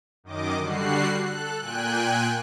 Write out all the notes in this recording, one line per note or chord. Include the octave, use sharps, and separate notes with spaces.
F#2 D#3 D#5 D6
D3 G3 F#4 F#6 C7
A4 F#6
A#2 G5 G#5 F#6